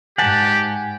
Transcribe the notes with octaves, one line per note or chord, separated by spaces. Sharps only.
G#2 G4 F#5 G#5 A5